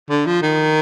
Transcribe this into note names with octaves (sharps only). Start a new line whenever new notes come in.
D3
F3
D#3